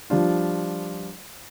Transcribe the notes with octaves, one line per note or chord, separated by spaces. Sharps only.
F3 G3 D4 F4